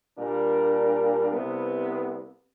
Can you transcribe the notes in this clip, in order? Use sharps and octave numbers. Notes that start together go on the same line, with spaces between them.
A#2 G3 D4 A#4
C2 C3 B3